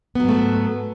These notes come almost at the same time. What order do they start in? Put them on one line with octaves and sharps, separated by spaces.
B3 F#3 G#2 A3